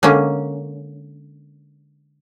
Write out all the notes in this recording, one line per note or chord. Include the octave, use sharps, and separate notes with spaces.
D3 G#3 A#3 C#4